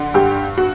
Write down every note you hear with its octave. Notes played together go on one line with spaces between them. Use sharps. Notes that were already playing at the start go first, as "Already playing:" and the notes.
Already playing: D3
G2 G4
F#4